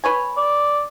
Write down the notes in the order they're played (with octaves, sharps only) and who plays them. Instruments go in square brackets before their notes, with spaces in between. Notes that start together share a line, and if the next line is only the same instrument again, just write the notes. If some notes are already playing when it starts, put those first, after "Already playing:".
[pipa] B4 C#5 G#5
[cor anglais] D5